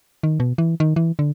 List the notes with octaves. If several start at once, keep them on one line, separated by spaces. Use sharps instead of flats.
D#3
B2
E3
D#3
E3
D3